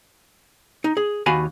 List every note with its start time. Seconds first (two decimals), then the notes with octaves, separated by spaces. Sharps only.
0.84 D#4
0.97 G#4
1.26 D#2 F#4 F5 G#5 B5